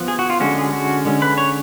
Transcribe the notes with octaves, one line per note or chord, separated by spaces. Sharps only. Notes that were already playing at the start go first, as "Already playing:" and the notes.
Already playing: F3 B3
G#4
F#4
F4
D3 G#3 C#4 F#4
G#4
F#4
D3 G#3 C#4
B4
C#5